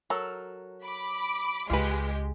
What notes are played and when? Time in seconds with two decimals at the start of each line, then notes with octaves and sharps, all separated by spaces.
0.10 F#3 A4 A#4
0.85 B5 D6
1.70 C#2 G#3 F4 G4 B4